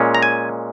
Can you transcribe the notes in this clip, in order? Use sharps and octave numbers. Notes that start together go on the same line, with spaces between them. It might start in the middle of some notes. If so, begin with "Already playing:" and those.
Already playing: A#2 G#3 C#4
A#5
G#5